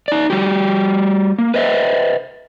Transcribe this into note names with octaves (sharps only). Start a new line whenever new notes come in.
D#4 D5
G3 F#4 G4
A#3
B4 C5 D#5 E5